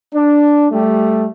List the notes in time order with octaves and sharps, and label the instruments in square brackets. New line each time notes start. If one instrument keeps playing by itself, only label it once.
[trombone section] D4
G3 A3